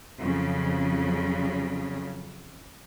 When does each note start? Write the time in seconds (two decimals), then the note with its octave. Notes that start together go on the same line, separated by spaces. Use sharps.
0.21 F2 C#3 F#3